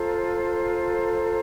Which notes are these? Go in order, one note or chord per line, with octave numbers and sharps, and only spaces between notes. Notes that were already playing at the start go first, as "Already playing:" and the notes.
Already playing: F4 A4 C5 A#5
A#5